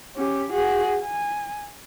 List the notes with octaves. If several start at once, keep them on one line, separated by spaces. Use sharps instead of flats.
C#4 G4
F#4 G#4
G#5